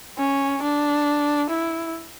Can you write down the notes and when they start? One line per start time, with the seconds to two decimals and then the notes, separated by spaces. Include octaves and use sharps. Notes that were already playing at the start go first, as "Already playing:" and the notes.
0.18 C#4
0.63 D4
1.50 E4